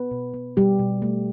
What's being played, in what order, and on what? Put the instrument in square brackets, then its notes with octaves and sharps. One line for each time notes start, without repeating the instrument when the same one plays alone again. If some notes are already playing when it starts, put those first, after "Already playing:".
Already playing: [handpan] B3 B4
B2
B3
B2 G3 G4
B2
A3